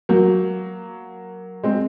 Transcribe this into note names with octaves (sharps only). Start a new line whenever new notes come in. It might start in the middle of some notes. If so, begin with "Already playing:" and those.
F#3 A#3
G#3 C4